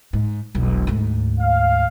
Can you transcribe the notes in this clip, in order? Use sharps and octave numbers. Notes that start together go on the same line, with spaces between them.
G#2
E1 B1
D2 G#2
F5